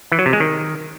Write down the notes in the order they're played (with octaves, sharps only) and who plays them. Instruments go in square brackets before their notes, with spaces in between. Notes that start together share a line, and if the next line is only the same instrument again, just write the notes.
[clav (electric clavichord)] E3
F#3
C3
G#3
D#3